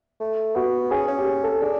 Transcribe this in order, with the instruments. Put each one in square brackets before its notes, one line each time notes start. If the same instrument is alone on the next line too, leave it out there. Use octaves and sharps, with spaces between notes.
[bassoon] A3
[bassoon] B3 [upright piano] F#4
[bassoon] C#4 [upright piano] G#4
[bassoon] C#4
[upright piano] G4
G#4
A4
[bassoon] D4 [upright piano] G#4